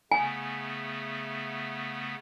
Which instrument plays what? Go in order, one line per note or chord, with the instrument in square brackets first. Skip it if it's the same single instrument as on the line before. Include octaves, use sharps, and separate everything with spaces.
[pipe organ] C#3 A3 B3 [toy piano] G#5